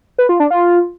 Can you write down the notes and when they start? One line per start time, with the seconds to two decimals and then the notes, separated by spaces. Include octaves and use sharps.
0.18 B4
0.29 F4
0.40 D4
0.50 F4